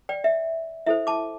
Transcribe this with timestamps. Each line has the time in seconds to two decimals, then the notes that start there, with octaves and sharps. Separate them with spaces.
0.09 D5 G5
0.24 E5
0.86 E4 A4 C5 E5
1.07 A5 D6